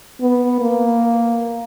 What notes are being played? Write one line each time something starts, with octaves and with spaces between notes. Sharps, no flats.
B3
A#3